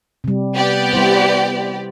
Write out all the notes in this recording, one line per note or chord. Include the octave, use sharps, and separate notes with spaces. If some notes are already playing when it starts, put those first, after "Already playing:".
C3 G3
B3 G4 D5
G3 E4 C5